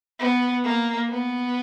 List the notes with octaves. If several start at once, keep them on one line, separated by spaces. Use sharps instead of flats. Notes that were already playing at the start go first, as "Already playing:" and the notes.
B3
A#3
B3